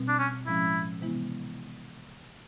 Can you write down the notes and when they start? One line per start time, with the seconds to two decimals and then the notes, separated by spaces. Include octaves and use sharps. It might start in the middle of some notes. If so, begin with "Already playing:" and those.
Already playing: B2 G3 C4
0.08 D4
0.19 C#4
0.46 A2 F3 G#3 C#4 E4
1.01 C3 E3 G#3 B3 E4